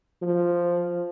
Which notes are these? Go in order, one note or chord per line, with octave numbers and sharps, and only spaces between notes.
F3